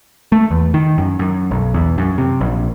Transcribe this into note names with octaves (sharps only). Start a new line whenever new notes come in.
A3
E2
D#3
F#2
F#2
B1
E2
F#2
C3
A#1